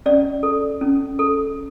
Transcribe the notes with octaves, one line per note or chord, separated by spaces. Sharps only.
C#4 D5
A4
C#4
A4